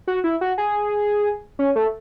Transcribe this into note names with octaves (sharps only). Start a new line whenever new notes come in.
F#4
E4
F#4
G#4
C#4
A3